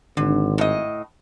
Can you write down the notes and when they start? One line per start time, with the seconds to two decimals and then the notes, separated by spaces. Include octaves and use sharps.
0.17 G#1 D3
0.58 A2 D#5